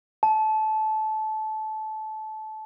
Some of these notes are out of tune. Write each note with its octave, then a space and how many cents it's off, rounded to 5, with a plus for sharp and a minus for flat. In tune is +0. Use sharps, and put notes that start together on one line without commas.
A5 -20